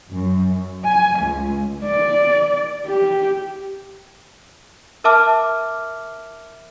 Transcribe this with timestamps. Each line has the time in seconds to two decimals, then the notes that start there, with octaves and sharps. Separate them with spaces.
0.11 F#2
0.86 G#5
1.23 C#2
1.84 D5
2.86 G4
5.04 A#4 E5 A5 D6 F6